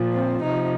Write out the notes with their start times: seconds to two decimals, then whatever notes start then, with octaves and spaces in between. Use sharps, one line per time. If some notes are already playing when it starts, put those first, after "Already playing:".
Already playing: A#2 F3
0.14 C4
0.42 C3 F3 D#4